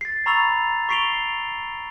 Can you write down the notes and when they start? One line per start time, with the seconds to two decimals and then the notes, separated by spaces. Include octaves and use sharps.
0.01 A6 C7
0.26 A#5 B5 C#6 E6 A6 F7
0.89 C#6 B6 C7 D7 F7 G7